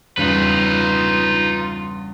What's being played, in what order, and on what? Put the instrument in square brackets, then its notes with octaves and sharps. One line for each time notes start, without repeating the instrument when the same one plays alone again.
[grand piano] E2 G2 C#3 [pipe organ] D#4 [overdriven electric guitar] F4 B4